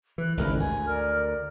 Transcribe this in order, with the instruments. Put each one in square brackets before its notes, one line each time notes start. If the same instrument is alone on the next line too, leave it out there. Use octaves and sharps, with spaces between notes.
[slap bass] E3 [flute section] F#6
[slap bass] G#1 C#2 G2 [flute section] E4 A4 A#4
[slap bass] D2 [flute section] G#5
[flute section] A#4 D5 F6